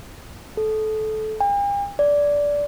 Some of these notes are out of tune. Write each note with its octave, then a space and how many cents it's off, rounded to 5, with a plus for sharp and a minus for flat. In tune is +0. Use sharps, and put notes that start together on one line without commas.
A4 -20
G5 +45
D5 -15